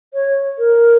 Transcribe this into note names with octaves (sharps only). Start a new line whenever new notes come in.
C#5
A#4